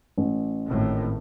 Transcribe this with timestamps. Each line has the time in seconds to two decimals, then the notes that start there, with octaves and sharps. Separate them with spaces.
0.18 A1
0.69 G#1 A2